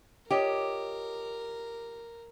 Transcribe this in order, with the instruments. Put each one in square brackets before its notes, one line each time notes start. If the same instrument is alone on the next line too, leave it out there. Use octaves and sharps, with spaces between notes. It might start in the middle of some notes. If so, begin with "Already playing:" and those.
[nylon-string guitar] F4 C#5 D#5 [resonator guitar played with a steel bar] G4 [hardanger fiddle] A#4